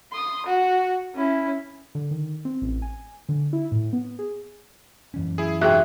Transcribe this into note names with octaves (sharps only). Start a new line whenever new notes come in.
C6 D#6
F#4
C#4 E4
D3
D#3
C4
A1
G#5
D3
E4
A2
B3
G#4
F#2 E3 C#4
E4 G#4
G#2 C3 F#4 G#4 E5 G5 F#6